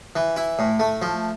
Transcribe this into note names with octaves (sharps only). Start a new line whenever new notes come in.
E3
E4
A2
A3
F3